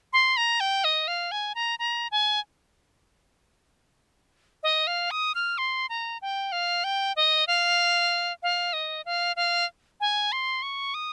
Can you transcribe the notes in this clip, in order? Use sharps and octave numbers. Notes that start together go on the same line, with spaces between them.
C6
A#5
G5
D#5
F5
G#5
A#5
A#5
G#5
D#5
F5
D#6
F6
C6
A#5
G5
F5
G5
D#5
F5
F5
D#5
F5
F5
G#5
C6
C#6
D#6